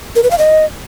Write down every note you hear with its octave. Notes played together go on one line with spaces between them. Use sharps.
A#4
B4
F5
D#5